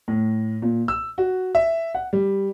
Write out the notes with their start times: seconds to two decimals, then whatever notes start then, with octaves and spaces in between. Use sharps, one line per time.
0.08 A2
0.62 A#2
0.88 E6
1.18 F#4
1.55 E5
1.95 F#5
2.13 G3